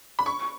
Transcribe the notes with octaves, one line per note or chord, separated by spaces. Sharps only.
B5
C#6